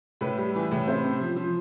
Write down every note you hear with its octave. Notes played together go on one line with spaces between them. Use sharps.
A2 B4
G3
E3
A2
C3 C5
C3
F3
F3